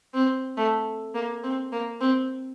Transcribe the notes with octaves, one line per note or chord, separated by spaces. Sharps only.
C4
A3
A#3
C4
A#3
C4